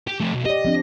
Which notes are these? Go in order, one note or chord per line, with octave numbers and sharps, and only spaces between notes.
G4
F3 A3
B1
G4 D5 D#5
F3 C4 D4